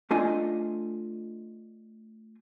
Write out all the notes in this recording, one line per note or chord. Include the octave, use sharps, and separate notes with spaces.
A3 D4 F4 D#5 G#5